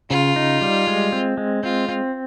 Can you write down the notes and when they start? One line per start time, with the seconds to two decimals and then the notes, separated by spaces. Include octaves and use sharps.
0.11 C#3 F4
0.36 D#4
0.61 G3
0.87 G#3
1.12 C4
1.38 G#3
1.63 C4 F4
1.89 C4